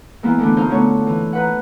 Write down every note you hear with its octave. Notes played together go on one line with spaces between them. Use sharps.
E3 G#3 A#3 B3 E4
D3 E3 A3 B3 D4
A#2 D#4 F4 C5 G6
D3 A3 B3 C#5
E3
D#4 B4 F#5